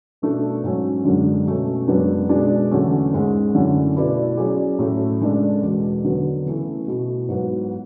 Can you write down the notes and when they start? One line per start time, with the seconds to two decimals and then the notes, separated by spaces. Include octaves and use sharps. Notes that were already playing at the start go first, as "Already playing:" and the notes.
0.22 B2 A3 D4 A4
0.63 G#2 F#3 C#4
1.05 F#2 D3 G#3 D4
1.46 B2 A3 C#4
1.88 F#2 C#3 G#3 B3 D4
2.29 B2 G#3 D4 G#4 D5
2.71 E2 D3 F#3 A3 C#4
3.13 G#2 G#3 C#4 G#4
3.55 F#2 D3 A3 C#4 E4
3.96 B2 A3 E4 B4 D5
4.37 F#3 C#4 G#4 D5
4.79 A2 F#3 A3 C#4
5.21 C#3 G#3 D4 A4 D5
5.62 E2 B2 G#3
6.04 D3 F#3 B3
6.46 C#3 E3 A3
6.87 B2 A3 E4
7.29 G#2 F#3 B3